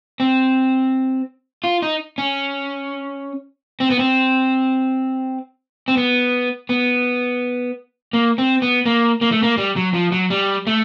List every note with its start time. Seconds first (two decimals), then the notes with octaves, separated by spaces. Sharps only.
0.20 C4
1.64 F4
1.82 D#4
2.18 C#4
3.80 C4
3.91 B3
3.99 C4
5.88 C4
5.97 B3
6.69 B3
8.13 A#3
8.38 C4
8.62 B3
8.86 A#3
9.21 A#3
9.32 A3
9.43 A#3
9.58 G3
9.76 F#3
9.94 F3
10.12 F#3
10.30 G3
10.67 A3